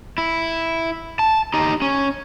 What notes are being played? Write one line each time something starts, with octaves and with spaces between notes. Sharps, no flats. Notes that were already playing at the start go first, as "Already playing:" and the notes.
E4
A5
D#4 G4
C#4